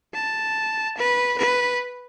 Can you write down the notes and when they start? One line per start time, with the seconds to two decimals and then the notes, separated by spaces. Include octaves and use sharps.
0.14 A5
0.97 B4
1.38 B4